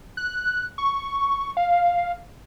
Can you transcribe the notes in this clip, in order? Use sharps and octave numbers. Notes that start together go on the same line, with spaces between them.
F#6
C#6
F5